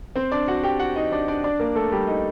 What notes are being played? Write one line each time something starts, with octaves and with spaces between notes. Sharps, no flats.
C4 C5
D4 D5
F#4 F#5
G4 G5
F#4 F#5
D#4 D#5
D4 D5
D4 D5
D4 D5
A#3 A#4
A3 A4
G3 G4
D#4 D#5